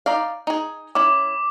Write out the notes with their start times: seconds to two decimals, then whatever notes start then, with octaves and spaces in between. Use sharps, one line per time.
0.06 D#4 D5 F5
0.47 D#4 G#4
0.95 C#4 E4 D6